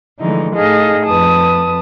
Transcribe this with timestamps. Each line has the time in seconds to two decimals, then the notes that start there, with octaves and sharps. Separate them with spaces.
0.19 D3 E3 F3 G#3 A3 D#4
0.54 A2 D#4 G#4 A4 D#5 F5
1.04 F2 B4 A5 D#6